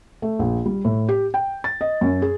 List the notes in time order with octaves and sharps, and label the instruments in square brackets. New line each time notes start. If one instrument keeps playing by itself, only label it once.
[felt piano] A3
A#1
G3
A2
G4
G5
A6
D#5
F#2
G#4